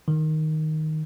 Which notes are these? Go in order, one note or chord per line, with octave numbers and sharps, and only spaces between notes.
D#3